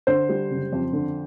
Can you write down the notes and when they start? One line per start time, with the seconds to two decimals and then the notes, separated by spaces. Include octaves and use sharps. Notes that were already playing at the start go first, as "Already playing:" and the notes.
0.07 D3 C5
0.29 G3
0.51 F#1
0.73 F2
0.93 D3